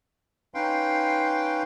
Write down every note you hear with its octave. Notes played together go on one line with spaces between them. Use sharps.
C#4 D#4 B4 F5 G5 C6